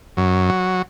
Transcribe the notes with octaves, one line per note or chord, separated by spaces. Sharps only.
F#2
F#3